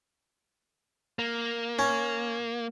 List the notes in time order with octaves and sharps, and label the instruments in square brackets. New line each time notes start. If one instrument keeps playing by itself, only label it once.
[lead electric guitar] A#3
[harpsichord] C#4